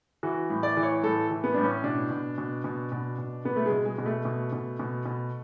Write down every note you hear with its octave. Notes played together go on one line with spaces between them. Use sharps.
E3 F#4
A2
D5
E3
C#5
A2 A4
E3
B3
A2 D4
C#4
B2 D4
B2
B2
B2
B2
B2
B2 B3
A3
G#3
B2
G#3
B2
A3
B2
B2
B2
B2